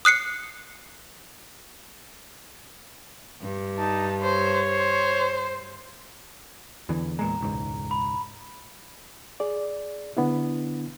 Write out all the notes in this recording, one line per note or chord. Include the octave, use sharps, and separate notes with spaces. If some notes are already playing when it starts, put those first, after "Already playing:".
D#6 F#6 C7 C#7
G2
D#4 A5
C5 C#5
C5
E2 D3 E3
E2 A#2 G#3 A#5
E1 C#2 G#2
B5
G#4 D5
D3 B3 D4 E4